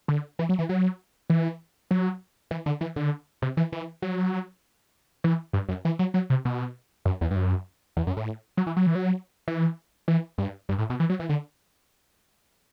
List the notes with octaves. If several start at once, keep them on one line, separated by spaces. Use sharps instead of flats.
D3
E3
F#3
E3
F#3
E3
F#3
E3
D3
E3
D3
C3
E3
E3
F#3
E3
G2
F#2
E3
F#3
F#3
C3
B2
F#2
E2
G2
F#2
E2
F#2
A2
F#3
E3
F#3
E3
F#3
E3
E3
G2
G2
A2
B2
E3
F#3
E3
D3